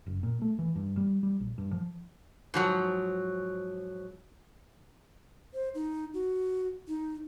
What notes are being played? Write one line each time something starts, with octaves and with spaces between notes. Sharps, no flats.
F#1
A#2
A3
E3
G2
G3
G3
A#1
G2
F3
G#2 F3 F#3
C5
D#4
F#4
D#4